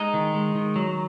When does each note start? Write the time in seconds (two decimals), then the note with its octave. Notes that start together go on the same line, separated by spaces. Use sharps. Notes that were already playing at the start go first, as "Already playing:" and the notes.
Already playing: G#3 D#4 D#5
0.14 D#3
0.34 G#3
0.55 D#3
0.76 F#3